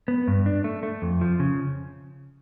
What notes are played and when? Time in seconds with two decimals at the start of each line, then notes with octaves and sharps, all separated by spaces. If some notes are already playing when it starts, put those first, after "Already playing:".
0.08 B3
0.28 G2
0.46 D4
0.64 A3
0.83 A3
1.02 F2
1.21 F3
1.40 C#3